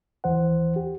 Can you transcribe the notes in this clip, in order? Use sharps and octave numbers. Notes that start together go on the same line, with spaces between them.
D#2 E3 C5 F#5
G4